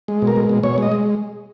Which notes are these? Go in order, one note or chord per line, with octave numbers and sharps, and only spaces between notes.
G#3
B2
A#4
G#3
B2
B2 C#5
G#3 D#5
G#3